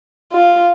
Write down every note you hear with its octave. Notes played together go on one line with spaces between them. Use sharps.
F4